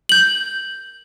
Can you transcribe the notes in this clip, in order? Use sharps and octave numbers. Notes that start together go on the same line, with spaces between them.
G6 F#7